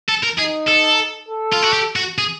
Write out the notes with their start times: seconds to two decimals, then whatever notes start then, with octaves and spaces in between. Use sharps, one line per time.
0.09 A4
0.24 A#4
0.39 D#4 G#4
0.68 A4
1.28 A4
1.53 F4
1.63 F#4
1.73 G4
1.96 F#4
2.18 G#4